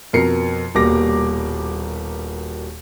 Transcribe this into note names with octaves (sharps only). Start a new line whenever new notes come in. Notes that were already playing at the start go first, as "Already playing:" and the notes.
F2 B2 A#4 C7 C#7
D#1 B2 G3 A#3 D6 A#6